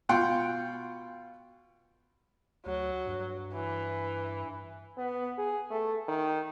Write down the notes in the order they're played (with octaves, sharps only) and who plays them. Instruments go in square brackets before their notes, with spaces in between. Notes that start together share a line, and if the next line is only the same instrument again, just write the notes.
[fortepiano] B2 F4 F#5 G5 C6
[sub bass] D2 [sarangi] F#3
[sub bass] G2
[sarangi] E3
[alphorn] B3
G#4
A3
D#3